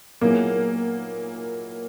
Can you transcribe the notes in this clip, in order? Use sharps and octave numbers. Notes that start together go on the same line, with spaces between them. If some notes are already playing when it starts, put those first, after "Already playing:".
A#2 F#3 A#3 B3 E4 G#4